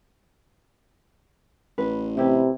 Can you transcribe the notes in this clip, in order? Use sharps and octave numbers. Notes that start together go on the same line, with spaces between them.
A1 B4
C3 E4 G4 B4